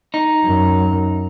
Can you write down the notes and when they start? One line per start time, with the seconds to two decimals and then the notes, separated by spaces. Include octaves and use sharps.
0.14 D#4
0.44 F#2